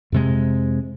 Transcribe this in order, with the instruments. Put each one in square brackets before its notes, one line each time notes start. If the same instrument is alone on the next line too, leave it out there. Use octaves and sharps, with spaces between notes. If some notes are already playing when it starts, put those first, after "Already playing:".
[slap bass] F2 C3 G#3